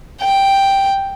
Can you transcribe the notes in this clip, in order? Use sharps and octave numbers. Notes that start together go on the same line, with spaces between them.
G5